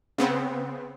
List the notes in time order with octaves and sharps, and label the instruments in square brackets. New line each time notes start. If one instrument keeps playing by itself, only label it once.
[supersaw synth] C#3 B3 C4